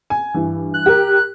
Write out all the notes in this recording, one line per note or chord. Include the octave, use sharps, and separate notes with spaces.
G#5
G2 E3
F#6
G4 A#4